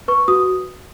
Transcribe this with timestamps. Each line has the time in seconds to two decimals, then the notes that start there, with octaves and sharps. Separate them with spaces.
0.08 B4 C#6
0.28 F#4 D#6